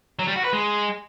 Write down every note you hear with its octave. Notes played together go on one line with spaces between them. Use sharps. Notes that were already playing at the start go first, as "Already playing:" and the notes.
F#3
G3
F#4
B4
G#3